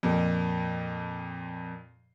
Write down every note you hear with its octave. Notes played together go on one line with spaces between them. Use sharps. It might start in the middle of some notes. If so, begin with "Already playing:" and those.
F2 A#2